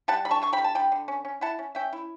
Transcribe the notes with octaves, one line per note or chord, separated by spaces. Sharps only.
G3 F#5 A5
D3 B5
A5 C#6
D3 C#6
G5 B5
G3
A5
D3 G5 B5
D3
C#4
C#4
E4 F#5 A5
C#4
C#4 E5 G5
E4